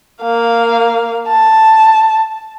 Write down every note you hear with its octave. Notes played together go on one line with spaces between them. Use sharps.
A#3 F5
A5